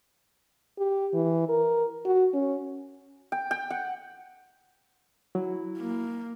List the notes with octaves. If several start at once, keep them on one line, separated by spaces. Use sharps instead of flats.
G4
E3
A#4
F#4
C#4
G5
G5
F#5
F#3 E4
A#3